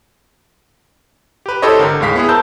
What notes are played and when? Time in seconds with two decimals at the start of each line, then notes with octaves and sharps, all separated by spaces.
1.46 G4 B4
1.62 E4 G4 A4 C5 C#5 D#5
1.79 G#1 D3 A#4
2.00 D#2 A2 G#3 F5 B6
2.16 B3 E4 G#4
2.29 A#4 C5 A5 E6 G6